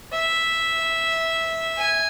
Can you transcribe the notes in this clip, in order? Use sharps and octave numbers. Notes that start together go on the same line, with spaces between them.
E5
G#5